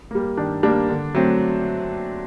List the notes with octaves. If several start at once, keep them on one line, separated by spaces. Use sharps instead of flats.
G3 A#3
D#3 D4
G3 A#3 D4
D3
F#3 A3 C4